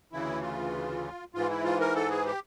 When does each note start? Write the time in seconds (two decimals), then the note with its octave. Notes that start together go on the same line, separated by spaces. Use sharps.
0.12 D2 C#3 E3 E4
0.42 F4
1.34 G#2 E3 F4
1.50 E4
1.64 F4
1.80 A#4
1.95 A4
2.11 G#4
2.26 G4